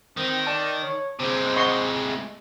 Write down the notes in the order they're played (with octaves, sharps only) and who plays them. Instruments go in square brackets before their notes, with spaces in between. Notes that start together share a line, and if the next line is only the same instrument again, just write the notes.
[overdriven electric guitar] D#3 [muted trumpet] C4
[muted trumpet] D5 [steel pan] A5
[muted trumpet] C#5
[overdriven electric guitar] C3 G#3 [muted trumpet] C5
[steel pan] D#5 C6 C#6
[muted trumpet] A3